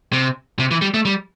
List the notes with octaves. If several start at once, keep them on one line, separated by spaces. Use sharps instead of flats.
C3
C3
E3
G3
A3
G3